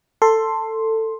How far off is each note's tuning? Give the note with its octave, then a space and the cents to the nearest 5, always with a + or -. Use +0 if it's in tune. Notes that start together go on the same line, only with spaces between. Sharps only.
A4 +15 C6 +5